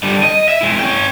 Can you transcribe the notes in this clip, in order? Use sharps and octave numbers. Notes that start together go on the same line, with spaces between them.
D3 G3
D#5
E5
G#3 E4
C#4 G5